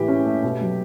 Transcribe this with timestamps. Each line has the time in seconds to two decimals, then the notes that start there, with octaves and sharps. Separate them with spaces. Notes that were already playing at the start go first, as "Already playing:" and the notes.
Already playing: A2 E3 A3 G4
0.08 C#4
0.26 A3
0.43 B2
0.61 F#3